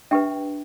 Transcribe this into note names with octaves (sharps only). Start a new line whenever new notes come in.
D4 G4 B4 E5 G5